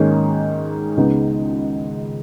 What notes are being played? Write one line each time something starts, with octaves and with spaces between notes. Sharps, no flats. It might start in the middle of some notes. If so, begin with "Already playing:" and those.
Already playing: G#2 D#3 A#3 C#4 G#4
C#2 C#3 G#3 B3 D#4